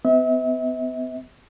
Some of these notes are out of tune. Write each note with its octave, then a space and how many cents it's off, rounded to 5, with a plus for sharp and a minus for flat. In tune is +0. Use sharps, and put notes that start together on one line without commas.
B3 +35 E5 -40